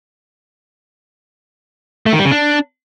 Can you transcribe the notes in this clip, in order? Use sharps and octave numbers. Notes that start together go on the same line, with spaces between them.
A3
D#3
G3
C#3
D4